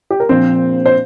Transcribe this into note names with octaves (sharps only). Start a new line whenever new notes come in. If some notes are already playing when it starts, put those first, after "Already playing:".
G4
A#4
A#1 A#2 F3 C4 C5
C5